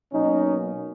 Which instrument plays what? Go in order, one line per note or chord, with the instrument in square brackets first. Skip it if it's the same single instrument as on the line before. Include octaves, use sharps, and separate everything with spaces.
[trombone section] B2 F#3 A#3 C#4 D#4